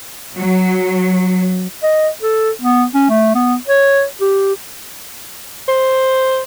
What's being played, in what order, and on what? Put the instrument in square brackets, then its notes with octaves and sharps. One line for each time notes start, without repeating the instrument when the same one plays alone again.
[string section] F#3
[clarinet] D#5
A4
B3
C#4
A3
B3
C#5
G4
[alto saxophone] C5